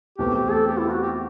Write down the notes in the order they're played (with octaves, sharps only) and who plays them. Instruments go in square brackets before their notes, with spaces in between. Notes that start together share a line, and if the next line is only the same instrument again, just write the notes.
[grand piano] E2 B2 A3 C4 [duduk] G4
[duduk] G4
A4
G4
E4
F#4
G4